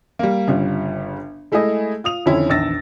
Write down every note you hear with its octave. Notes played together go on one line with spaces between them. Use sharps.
G3 A#3
G1 C#3 G3 F4
G#3 A3 E4 G#4 D#5
F4 D#6 F7
F2 D3 D#3 C#4 E4
A#1 E2 D#3 E6 A6 A#6